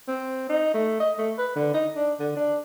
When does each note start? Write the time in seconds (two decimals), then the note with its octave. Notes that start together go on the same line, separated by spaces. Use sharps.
0.08 C4
0.49 D#4
0.74 A3
1.00 D#5
1.18 A3
1.38 B4
1.56 D3
1.74 D#4
1.96 D4
2.19 D3
2.36 D4